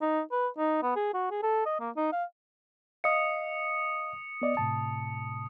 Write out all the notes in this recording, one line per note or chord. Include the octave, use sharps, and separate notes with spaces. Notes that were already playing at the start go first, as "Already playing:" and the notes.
D#4
B4
D#4
B3
G#4
F#4
G#4
A4
D#5
A#3
D#4
F5
D#5 F5 D#6 C#7
B3 D5 D#5
A2 C3 A5